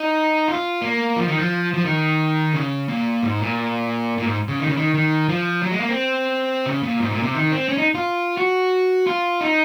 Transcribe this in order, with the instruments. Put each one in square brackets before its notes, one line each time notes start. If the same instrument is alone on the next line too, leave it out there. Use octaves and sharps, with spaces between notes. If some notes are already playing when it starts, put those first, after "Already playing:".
Already playing: [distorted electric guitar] D#4
F4
A#3
F3
D#3
F3
F3
D#3
C#3
A#2
G#2
A#2
A#2
G#2
C#3
D#3
C#3
D#3
D#3
F3
F#3
G#3
A#3
C4
C#3
A#2
G#2
A#2
C3
D#3
C4
C#4
D#4
F4
F#4
F4
D#4